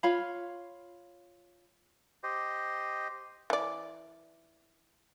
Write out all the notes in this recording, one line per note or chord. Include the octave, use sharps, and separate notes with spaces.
F4 C#5 F5 B5
G4 C5 D#5
E3 D5